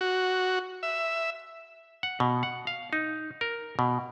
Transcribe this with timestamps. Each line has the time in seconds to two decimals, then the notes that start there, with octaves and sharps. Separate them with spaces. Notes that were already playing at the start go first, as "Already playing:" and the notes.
0.01 F#4
0.83 E5
2.03 F#5
2.20 B2
2.43 F#5
2.67 F5
2.93 D#4
3.41 A#4
3.79 B2